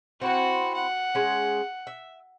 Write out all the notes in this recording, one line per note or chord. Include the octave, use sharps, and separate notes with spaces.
C4 E4 F#4 C5 F#5
F#5
G#3 C#4
E5